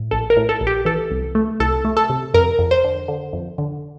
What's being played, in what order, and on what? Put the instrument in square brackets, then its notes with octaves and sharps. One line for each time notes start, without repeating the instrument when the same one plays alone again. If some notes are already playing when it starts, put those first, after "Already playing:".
Already playing: [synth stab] A2
A#1 A4
A#4
A2
A4
A#1
G4
E3 A4
C2
A3
C2 A4
A3
A4
C3
F2 A#4
F2
C5
D3
D3
F2
D3